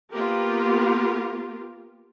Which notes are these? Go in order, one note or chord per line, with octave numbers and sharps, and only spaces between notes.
A#3 B3 F4 G4 A#4